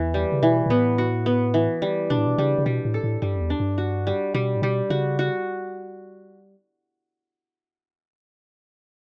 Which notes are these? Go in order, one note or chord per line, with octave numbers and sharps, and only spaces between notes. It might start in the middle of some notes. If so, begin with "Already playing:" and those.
Already playing: E2 E3
G3
C#3
B2 E3
B2
A2 B3
F#4
B3
E3
G3
B2 D4
A2
B2
C#3 G3
C#3
B2 G3
A2
A4
A2
G2 G3
F#2
E2
D4
G2
F#4
G3
B2 G3
A2
B2 G3
C#3 F#4
F#4